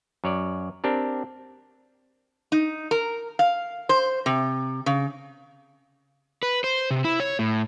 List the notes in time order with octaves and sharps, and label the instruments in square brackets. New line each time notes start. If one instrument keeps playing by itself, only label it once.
[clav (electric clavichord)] F#2 C#5 D5
C4 D4 G4 A#4
[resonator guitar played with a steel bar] D#4
A#4
F5
C5
C3
C#3
[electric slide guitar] B4
C5
C3
E4
C#5
A2